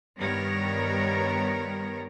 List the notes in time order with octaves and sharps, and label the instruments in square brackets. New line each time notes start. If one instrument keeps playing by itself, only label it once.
[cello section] G2 D#3 G3 B3 A#4 C#5